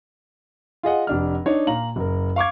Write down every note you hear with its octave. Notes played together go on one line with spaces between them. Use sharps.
F4 G#4 D#5 F#5
F1 D4 F6
D4 D#4 C#5
A#2 F5 A#5 F#7
F#1 A#4
F5 C#6 D6 G#6